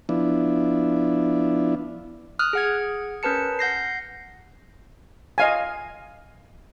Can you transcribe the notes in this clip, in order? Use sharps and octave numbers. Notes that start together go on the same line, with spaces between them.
F3 B3 D4 E4
D#6 F6 F#6
G#4 F#5 G#6
C#4 A#4 B4 A5 C#7
F#5 G6 A#6 C7
D#5 F5 G#5